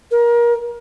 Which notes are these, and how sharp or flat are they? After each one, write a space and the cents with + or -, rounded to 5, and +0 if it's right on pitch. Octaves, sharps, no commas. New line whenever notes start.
A#4 +25